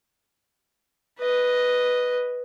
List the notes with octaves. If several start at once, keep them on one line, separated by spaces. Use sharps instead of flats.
B4 D#5